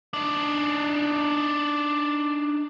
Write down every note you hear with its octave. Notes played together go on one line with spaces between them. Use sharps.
D4 D#4